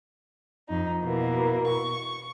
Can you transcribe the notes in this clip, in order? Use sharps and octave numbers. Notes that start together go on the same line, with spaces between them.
F2 D#4
B2 E3 A#3
C#6